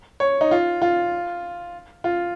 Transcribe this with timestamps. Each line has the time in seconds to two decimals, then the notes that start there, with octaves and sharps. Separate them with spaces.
0.20 C#5
0.41 D#4
0.51 F4
0.82 F4
2.04 F4